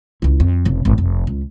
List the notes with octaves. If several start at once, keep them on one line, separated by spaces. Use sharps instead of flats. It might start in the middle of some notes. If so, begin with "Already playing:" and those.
C#2 E4
F2
F1 C#3
G#1
F1
C#2